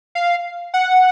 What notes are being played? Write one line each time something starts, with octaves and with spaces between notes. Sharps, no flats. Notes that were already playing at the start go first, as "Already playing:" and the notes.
F5
F#5